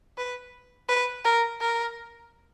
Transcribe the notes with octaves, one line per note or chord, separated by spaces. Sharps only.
B4
B4
A#4
A#4